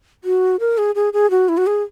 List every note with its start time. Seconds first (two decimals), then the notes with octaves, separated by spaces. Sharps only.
0.24 F#4
0.60 A#4
0.78 G#4
0.95 G#4
1.13 G#4
1.30 F#4
1.49 E4
1.58 F#4
1.67 G#4